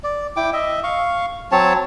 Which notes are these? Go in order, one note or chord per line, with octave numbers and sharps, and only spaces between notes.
D5
E4 G5 D6
D#5 E5
F5 C#6
F#3 C4 C#5 A5